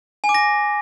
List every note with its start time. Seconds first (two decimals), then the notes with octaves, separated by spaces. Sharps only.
0.24 G#5
0.29 D6
0.34 A#6